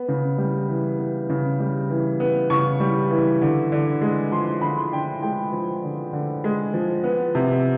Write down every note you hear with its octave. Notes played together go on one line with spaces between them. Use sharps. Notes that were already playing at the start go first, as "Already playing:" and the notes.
Already playing: B3
C#3
G3
E3
B3
C#3
G3
E3
B3
C#3 C#6
G3
E3
D3
D3
G#3
F3 C6
D3 B5
D3 G5
G#3 G5
F3
D3
D3
G#3
F3
B3
C3